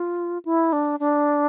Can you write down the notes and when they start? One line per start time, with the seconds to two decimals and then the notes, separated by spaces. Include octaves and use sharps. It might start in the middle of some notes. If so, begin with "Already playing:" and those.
Already playing: F4
0.45 E4
0.73 D4
1.00 D4